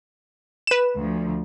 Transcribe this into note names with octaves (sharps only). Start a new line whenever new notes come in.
B4 E7
D2 F3